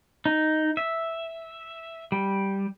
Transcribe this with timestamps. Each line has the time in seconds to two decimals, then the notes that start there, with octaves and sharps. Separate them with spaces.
0.26 D#4
0.77 E5
2.12 G3